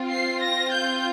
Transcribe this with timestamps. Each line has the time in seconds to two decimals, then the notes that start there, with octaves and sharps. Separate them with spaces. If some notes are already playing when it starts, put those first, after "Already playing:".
Already playing: C4 F4
0.11 C7
0.42 A#6
0.73 G6